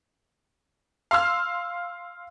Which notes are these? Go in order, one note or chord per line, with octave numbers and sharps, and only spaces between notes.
F5 C6 E6 F6